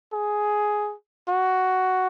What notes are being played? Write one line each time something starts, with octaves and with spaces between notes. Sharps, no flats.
G#4
F#4